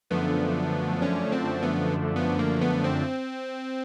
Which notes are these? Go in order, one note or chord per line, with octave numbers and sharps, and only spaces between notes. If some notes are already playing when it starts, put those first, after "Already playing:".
F#2 D3 F3 A3 B3 D4
C#4
C4
B3
B3
A#3
B3
C4